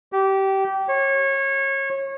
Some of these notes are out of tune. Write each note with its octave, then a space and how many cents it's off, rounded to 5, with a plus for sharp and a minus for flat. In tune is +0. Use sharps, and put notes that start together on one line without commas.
G4 -20
C#5 -25